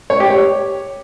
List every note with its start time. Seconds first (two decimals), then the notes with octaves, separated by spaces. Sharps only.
0.10 C#5
0.20 G4
0.30 C#5